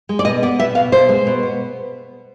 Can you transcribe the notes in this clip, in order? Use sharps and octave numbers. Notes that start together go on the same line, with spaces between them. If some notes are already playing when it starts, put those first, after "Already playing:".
G#3
D5
B2 D#5
B3 D5
B2 E5
B2 F5
B2 C5
G#3
B2
B3